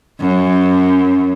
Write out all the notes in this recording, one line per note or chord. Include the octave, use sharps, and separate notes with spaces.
F#2